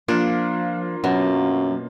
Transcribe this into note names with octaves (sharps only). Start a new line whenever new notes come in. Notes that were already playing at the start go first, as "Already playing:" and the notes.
F3 A#3 D4 F4
F#2 B2 F#3